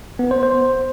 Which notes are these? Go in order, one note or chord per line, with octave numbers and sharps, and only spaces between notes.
B3
C5
C5